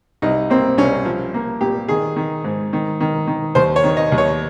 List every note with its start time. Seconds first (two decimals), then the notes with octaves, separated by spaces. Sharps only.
0.22 C2 D#4
0.50 A#3 C4
0.77 C2 C#4
1.05 F3
1.34 A#3
1.61 A#2 G4
1.88 D#3 G#4
2.16 D#3
2.44 G#2
2.73 D#3
3.01 D#3
3.27 D#3
3.55 D#2 C5
3.76 C#5
3.84 D#3
3.97 D#5
4.12 D#2
4.18 C#5